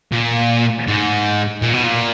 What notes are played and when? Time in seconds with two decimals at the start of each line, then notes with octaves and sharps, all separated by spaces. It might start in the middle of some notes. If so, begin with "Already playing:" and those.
0.12 A#2
0.88 G#2
1.62 A#2
1.74 B2
1.84 A#2